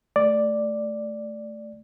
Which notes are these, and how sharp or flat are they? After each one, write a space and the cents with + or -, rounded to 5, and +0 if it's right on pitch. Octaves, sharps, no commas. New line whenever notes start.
A3 +0 D5 +0